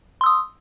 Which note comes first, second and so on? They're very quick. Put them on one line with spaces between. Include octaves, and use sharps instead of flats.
C6 E6 D#6